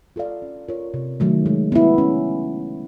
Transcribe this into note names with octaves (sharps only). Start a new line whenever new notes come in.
F4 A4 D5 F5
C#4
F4 A#4 C#5
C3
D#3 F#3 A3
G#3
B3 E4
C#4